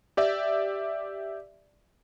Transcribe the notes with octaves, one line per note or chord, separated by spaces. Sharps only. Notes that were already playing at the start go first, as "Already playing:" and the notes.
G4 D5 E5